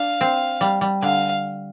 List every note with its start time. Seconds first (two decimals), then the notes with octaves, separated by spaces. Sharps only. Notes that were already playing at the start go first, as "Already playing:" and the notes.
Already playing: D4 F5
0.21 C4
0.61 G3
0.81 G3
1.02 D3 F5